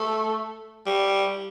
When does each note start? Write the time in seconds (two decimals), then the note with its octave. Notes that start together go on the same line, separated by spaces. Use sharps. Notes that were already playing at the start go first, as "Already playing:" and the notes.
Already playing: A3
0.86 G3